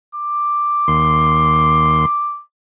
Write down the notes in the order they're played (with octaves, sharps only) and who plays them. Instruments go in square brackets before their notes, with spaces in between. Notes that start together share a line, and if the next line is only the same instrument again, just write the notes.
[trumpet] D6
[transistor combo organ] D#2 C6